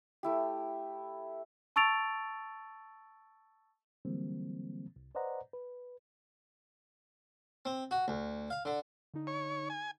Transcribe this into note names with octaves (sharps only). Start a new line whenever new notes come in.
A3 E4 G4
A5 C#6 E6 A6 D7 F7
D3 E3 F#3 G3 A#3 C4
C2
B4 C5 D5 D#5 F#5 A#5
B4
C4
F#4
D2
F5
D3
D3 D#4
C#5
G#5